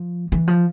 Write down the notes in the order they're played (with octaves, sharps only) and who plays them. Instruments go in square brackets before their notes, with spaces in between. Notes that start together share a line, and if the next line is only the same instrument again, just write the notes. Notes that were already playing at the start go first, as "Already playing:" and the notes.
Already playing: [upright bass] F3
E3
F3